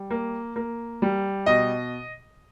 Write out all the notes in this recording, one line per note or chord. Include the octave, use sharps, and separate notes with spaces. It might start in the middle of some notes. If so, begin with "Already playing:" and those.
Already playing: G3
A#3
A#3
G3
B2 D#5